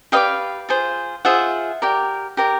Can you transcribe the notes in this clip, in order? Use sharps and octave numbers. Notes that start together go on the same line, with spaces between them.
G4 B4 D5 D#5 F5
F4 G#4 C5
F4 G#4 C5 E5 F#5
G4 A#4 D5
G4 A#4 D5